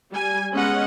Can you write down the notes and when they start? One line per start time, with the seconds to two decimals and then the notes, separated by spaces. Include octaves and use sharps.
0.13 G3 G#5
0.53 G#3 B3 C#4 D#5 F#5